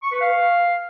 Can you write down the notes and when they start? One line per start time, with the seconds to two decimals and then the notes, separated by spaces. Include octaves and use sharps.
0.02 C#6
0.12 B4
0.21 F5